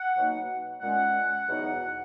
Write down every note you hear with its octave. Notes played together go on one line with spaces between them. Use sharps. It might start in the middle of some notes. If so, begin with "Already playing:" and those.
Already playing: F#5
B2 F#3 A#3 D#4
A#2 G#3 C#4 F#5
E2 B2 F#3 B3 D#4